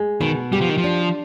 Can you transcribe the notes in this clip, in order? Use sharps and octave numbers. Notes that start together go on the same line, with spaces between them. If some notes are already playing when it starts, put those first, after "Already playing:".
Already playing: G#3
B2 D#3
G3 G4
F3
D#3
F3
D4